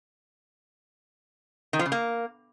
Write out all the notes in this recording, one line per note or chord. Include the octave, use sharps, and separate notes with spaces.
D#3
F3
C#3
A#3